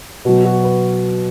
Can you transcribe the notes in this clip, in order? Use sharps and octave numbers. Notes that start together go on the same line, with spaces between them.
B2 F#3 F#4
F#4
B4